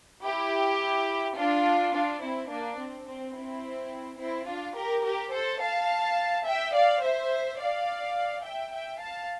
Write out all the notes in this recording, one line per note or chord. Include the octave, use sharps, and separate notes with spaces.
E4 G4
D4 F4
D4 F4
C4 E4
A#3 D4
C4
C4
C4 E4
C4 E4
D4 F4
G4 A#4
G4 A#4
A4 C5
F5 A5
E5 G5
D5 F5
C5 E5
D5 F5
E5 G5
E5 G5
F5 A5